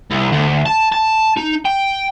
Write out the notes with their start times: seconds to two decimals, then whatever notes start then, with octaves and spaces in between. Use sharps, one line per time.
0.11 C2
0.32 D2
0.66 A5
0.92 A5
1.37 D#4
1.65 G5